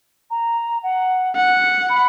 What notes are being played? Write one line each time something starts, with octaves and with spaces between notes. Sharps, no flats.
A#5
F#5
F#5
B5